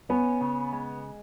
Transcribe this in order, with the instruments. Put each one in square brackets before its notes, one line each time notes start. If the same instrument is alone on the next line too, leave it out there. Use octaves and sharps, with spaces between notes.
[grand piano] B3 [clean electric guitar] C#4
[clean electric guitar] C#3
G#3